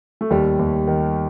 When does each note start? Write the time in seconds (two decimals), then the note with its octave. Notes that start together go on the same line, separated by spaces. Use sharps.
0.21 A3
0.30 D#2 G3
0.59 D#2
0.87 D#3